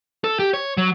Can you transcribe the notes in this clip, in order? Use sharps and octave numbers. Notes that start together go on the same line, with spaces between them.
A4
G4
C#5
F#3